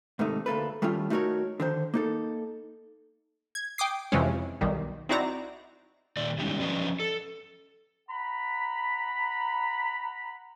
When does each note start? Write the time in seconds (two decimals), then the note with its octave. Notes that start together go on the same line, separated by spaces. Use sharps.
0.19 G#2 C3 D#3 A3 D#4
0.46 D2 A#3 A4 B4
0.82 D#3 G3 A3 C#4 F4
1.10 A3 D#4 F#4 G#4 A#4 C#5
1.60 D3 D#3 C5
1.94 A#3 D#4 A4
3.55 G#6
3.78 G5 D6 D#6 C7
4.12 F2 C3 E3 G#3 C#4
4.61 B1 D#3 G3
5.09 C4 D#4 E4 F#4 D5 A#5
6.17 A#2 D#3 D5
6.38 D#3 G3 G#3 B3 C#4 D#4
6.60 F3 C#4 D4 B4 D#5
7.00 A4
8.09 F#5 A#5 B5